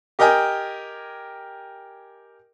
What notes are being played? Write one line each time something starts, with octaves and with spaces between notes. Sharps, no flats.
G4 A#4 D#5 G5 G#5